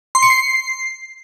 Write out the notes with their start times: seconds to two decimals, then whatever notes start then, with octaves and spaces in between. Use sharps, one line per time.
0.15 C6
0.22 C#7
0.30 C7